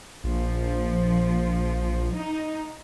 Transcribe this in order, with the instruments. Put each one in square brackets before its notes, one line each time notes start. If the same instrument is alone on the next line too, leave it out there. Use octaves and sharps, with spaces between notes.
[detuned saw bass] A#1 [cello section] F3
[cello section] D#4